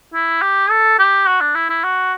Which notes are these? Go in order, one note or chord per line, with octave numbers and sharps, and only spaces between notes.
E4
G4
A4
G4
F#4
D4
E4
E4
F#4